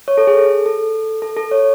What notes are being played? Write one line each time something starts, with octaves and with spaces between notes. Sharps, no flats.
C#5
A4
G#4
A4
A4
A4
A4
C#5